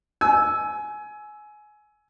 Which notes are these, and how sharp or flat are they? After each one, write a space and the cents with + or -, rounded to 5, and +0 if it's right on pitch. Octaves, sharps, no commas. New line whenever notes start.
G#5 +20 E6 +0